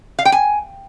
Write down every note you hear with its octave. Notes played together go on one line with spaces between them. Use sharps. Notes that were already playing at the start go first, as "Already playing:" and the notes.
F5
G5
G#5